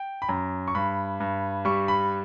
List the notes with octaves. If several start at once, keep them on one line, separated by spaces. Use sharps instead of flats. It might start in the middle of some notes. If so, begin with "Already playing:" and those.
Already playing: G5
B5
F#2 A#5
C#6
G2 B5
G2
G3 C#6
B5